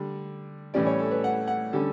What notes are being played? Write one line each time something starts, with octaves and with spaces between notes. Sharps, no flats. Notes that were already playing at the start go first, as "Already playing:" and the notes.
Already playing: D3 G3 D4
A2 E3 G3 C#4 D5
C#5
A4
B4
F#5
F#5
D3 G3 C#4 A4